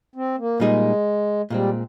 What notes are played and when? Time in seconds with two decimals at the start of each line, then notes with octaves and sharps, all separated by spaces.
0.15 C4
0.38 A#3
0.60 A#2 G3 G#3 A#3 D#4 G#4
1.50 A#2 G3 G#3 C4